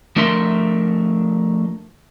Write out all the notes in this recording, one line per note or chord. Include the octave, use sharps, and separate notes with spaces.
F3 A3 D4 A#4 E5 C6